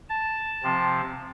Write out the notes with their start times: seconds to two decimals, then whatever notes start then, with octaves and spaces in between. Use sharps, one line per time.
0.10 A5
0.63 C3 F3 C4